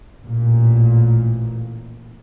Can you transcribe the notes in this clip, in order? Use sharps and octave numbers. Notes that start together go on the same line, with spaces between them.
A1 A#2